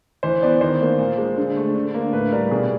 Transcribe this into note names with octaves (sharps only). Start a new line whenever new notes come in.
E3 C5
B3 D5
D#3 C5
A#3
A#2
G#3
D3
A3
D3
A#3
A2 B4
G3 A#4
B2 G#4